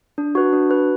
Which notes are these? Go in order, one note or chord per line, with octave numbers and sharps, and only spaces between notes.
D4
F#4 B4
D4
F#4 B4